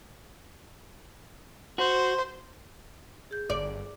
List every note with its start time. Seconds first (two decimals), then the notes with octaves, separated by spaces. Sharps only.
1.78 F#4 C5
3.31 G#4 G6
3.50 G1 D5